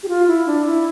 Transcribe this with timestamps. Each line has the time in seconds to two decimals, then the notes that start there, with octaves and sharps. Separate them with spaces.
0.03 G4
0.08 F4
0.27 E4
0.47 D4
0.66 E4